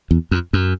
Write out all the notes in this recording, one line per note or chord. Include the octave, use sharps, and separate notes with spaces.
E2
F2
F#2